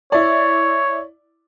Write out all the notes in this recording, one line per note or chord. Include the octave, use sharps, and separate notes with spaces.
E4 C#5 D5